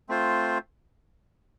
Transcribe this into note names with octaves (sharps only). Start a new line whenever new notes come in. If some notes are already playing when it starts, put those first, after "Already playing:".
A3 C4 F4 C5